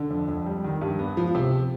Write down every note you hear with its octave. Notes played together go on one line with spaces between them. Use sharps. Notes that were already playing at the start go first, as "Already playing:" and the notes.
Already playing: D3
F2
F2
G3
D#3
G2
B3
F3
C3